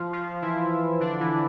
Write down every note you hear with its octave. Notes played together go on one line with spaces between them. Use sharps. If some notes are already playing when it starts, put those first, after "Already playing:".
Already playing: F3 F4
F3 F4
E3 E4
D3 D4
E3 E4